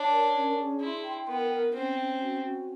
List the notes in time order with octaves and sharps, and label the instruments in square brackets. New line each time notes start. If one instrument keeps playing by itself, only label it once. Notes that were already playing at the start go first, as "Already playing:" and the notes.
Already playing: [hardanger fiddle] D4 [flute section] C#5
[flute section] A#4
C#4
G#4
[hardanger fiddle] E4 [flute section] C6
[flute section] G5
[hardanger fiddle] B3 [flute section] A#4
[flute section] A#4
[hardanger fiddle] C4 [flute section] C#4
[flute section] C#4
F#4
C#4